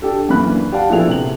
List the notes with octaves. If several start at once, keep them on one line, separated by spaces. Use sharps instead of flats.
D4 G4 A4
F#2 E3 A#3 D4 B5 F#6
G4 D5 F5 F#5 A5
A#1 B3 E4 G#4 A4 F7
C3 F#7